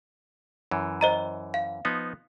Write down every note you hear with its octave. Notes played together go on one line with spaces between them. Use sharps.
F#2 E3
C5 D#5 A#5
F5
F3 B3 D#4